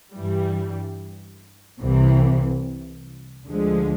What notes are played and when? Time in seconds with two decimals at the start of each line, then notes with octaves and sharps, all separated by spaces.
0.15 G2 E3 G3
1.81 C2 C3 E3
3.46 D2 D3 F3 G#3